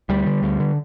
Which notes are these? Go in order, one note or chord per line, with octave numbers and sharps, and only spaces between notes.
D2 G3
D3
D2
D3